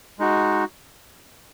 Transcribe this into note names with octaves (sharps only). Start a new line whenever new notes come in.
G#3 D#4 F#4